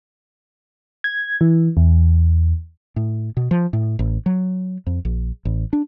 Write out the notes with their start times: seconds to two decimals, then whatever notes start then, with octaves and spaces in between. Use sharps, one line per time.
1.04 G#6
1.41 E3
1.77 E2
2.96 A2
3.37 B2
3.51 F3
3.73 A2
3.99 A1
4.26 F#3
4.87 F2
5.05 A#1
5.45 A1
5.73 D4